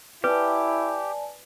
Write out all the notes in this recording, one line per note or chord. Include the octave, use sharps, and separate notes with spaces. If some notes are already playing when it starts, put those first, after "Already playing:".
E4 G4 B4 D5 G#5 A5